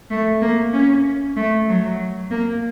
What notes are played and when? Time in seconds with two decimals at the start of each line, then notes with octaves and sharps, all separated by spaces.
0.10 A3
0.41 A#3
0.73 C#4
1.36 A3
1.68 F#3
2.31 A#3